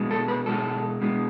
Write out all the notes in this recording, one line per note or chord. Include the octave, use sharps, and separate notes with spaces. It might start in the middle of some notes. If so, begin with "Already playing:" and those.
Already playing: B2 G#3
A4
B4
B2 G#3 A4
B2 G#3